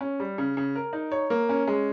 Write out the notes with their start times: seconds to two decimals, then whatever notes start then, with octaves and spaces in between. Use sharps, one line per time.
0.01 C#4
0.20 G3
0.38 C#3
0.57 C#3
0.76 A#4
0.93 D#4
1.12 C#5
1.30 A#3
1.49 C#4
1.68 G#3